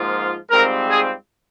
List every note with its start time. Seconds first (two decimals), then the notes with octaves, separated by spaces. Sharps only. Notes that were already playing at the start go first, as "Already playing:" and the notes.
Already playing: G#2 F3 A#3 F4
0.51 G#2 G3 C4 F4 A#4
0.88 G#4